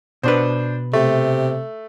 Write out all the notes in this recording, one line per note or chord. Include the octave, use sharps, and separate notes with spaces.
B2 D4 B4 C5
C3 A3